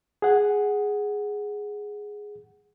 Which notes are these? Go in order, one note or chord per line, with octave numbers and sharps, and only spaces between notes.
G#4 F#5